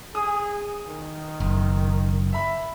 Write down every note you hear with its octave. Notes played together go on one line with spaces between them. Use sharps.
G#4 D#6
D#3
F#1
E5 B5